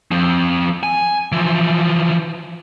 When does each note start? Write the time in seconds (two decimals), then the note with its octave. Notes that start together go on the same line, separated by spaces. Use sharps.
0.11 F3 C4
0.83 G#5
1.32 E3 F3